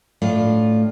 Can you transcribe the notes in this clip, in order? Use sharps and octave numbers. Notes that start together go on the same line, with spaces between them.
A2 A3 D4 F4